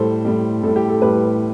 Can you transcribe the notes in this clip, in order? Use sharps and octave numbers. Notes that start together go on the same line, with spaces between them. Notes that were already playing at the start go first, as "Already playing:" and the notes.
Already playing: A2 G3 A4 C5
A2 G3
A2 G3 A4
G4
A4
A2 G3 G4 B4